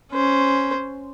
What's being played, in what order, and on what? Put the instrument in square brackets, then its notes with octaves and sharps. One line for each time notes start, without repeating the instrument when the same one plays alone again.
[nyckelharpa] C#4 C5